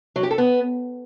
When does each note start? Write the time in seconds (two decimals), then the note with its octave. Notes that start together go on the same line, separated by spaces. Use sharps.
0.16 F#3
0.23 G4
0.31 A4
0.38 B3